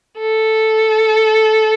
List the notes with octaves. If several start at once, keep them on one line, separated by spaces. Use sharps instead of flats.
A4